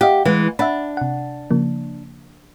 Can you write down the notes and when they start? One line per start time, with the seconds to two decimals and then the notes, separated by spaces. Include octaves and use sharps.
0.01 G4 D#5 F5 F#5
0.25 E3 G#3
0.59 D4 E5 F#5 B5
0.97 C3 F#5
1.51 C#3 F3 A#3